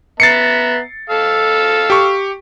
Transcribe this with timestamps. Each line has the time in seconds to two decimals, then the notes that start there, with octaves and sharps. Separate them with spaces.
0.20 B3 E5 A#5 A6 C7 C#7
1.10 A4 F5 E6
1.90 G4 C#6